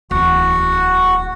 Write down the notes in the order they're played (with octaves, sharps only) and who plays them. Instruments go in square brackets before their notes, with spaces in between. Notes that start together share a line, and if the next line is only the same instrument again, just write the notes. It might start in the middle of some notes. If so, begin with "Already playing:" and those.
[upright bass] D1 E2 [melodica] F#4 F#5